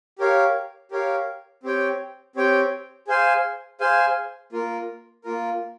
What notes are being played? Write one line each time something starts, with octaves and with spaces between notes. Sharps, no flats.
G4 A#4 C#5 F5
G4 A#4 C#5 F5
C4 G4 C#5 G5
C4 G4 C#5 G5
G#4 C5 F5 G#5
G#4 C5 F5 G#5
A#3 F4 A#4
A#3 F4 A#4